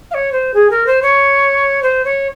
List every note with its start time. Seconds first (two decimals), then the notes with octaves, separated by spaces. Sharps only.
0.11 F5
0.14 C#5
0.32 C5
0.54 G#4
0.70 A#4
0.86 C5
1.02 C#5
1.82 C5
2.04 C#5